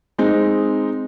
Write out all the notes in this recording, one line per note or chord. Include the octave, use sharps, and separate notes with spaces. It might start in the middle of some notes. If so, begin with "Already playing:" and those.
G#3 C4 D#4